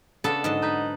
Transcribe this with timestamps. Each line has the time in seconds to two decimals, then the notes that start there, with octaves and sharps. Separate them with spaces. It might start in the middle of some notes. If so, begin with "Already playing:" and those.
0.24 C#3 B3 D4 A4 B4 A5
0.44 G#2 D3 F#3 D#5 A5
0.62 D#4 B4